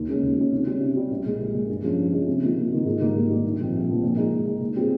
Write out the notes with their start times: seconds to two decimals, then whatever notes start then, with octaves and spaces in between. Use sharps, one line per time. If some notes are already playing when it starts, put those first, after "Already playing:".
Already playing: D#2
0.08 C#3 G#3 C#4
0.22 D#2
0.37 C#3 G#3 C#4
0.52 C3
0.67 G3 C#4
0.81 C3
0.95 G3 C#4
1.11 A#1
1.25 A#2 G#3
1.40 A#1
1.54 A#2 G#3
1.69 G2
1.83 F3 G#3 C#4
1.98 G2
2.13 F3 G#3 C#4
2.27 C3
2.42 D#3 A#3 F4
2.56 C3
2.72 D#3 A#3 F4
2.85 G#2
3.00 D#3 G3 A#3
3.15 G#2
3.29 D#3 G3 A#3
3.44 A#1
3.59 A#2 F3 C4
3.74 A#1
3.87 A#2 F3 C4
4.03 A#2
4.17 G#3 D#4
4.32 A#2
4.46 G#3 D#4
4.60 A#2
4.76 G3 C4 F4 G#4